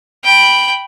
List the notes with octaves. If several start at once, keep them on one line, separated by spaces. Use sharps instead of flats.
G5 B5